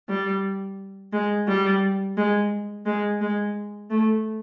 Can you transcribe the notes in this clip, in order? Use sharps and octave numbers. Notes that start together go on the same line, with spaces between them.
G3
G#3
G3
G#3
G#3
G#3
A3